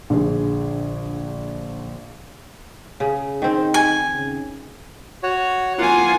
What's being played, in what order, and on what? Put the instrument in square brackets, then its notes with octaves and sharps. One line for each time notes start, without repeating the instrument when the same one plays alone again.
[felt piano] A#1 D3 G#4
[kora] C#3
[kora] D#3 C4 [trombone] D#4
[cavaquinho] G#5
[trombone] C#3
[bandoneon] F#4 C#5
[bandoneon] A#3 F#5 [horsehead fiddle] F4 G#5